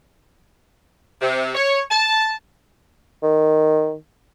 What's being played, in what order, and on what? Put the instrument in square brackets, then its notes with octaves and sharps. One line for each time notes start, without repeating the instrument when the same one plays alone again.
[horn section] C3
C#5
A5
[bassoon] D#3